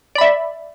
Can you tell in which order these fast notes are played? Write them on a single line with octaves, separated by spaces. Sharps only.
D5 B5 E5